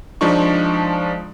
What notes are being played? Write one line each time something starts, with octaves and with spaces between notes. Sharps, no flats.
F3 G#3 D4 D#4 C#6